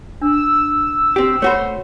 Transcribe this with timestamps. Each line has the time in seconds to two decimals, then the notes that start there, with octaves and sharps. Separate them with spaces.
0.21 D4 E6
1.16 C4 G4
1.42 A3 F#4 C5 C#5 B5